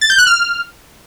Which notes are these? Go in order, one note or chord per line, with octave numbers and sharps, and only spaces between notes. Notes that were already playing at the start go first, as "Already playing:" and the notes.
A6
G6
F#6
F6